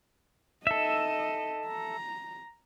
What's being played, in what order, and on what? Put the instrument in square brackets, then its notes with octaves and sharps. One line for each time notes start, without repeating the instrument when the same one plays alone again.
[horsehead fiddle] D#4 D#5 [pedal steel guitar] A4 E5
[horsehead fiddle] A#5